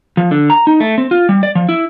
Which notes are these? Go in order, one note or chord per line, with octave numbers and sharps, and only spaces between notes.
F3
D3
A#5
D#4
A3
C4
F4
G3
D5
F3
E4